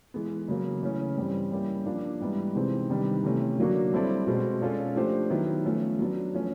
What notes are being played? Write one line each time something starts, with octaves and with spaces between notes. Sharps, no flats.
E3 G#3 B3
C#3 F#3 A#3
C#3 E3 A3 C#4
G2 E3 G3 C4
G3 A#3 C#4 E4 G4
F3 A#3 D4
G#2 E3 G3 B3 E4
C3 E3 G#3 C4 D#4
C3 D#3 G3 B3 D4
C3 E3 A3 C#4
D3 F#3 A#3 D4 F#4
G3 C4 E4 A4 D5
B2 G#3 C4
G#3 C#4 F4 A4 D5
F3 A3 D4 G4 C5
D#3 F#3 B3 E4
F3 A3 C#4
F#3 B3 D4
F3 A3 C#4